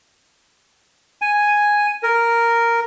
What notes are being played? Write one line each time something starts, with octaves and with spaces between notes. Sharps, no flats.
G#5
A#4